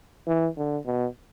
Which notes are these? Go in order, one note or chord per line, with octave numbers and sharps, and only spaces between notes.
E3
D3
B2